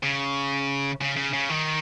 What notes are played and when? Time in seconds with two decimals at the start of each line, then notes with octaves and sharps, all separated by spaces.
0.03 C#3
1.01 C#3
1.16 C#3
1.33 C#3
1.49 D#3